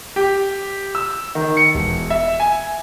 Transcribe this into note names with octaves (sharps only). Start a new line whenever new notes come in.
G4
E6
D#3
C#7
E1
E5
G#5